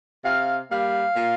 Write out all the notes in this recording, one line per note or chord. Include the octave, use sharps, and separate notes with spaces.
C3 F5
G3 A#3 F5
A#2